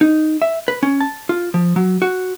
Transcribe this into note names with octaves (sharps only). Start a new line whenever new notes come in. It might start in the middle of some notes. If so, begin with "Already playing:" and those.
D#4
E5
B4
C#4
A5
F4
F3
F#3
F#4